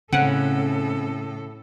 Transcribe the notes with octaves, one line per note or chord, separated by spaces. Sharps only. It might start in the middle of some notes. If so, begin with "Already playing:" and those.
A2 C#3 C4 C#4 A4 F#5